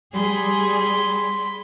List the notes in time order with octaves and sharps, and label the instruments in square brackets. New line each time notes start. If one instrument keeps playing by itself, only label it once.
[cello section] G3 G#4 [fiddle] B5 C6